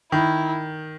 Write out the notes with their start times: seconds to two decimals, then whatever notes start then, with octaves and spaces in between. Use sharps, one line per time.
0.12 D#3 E4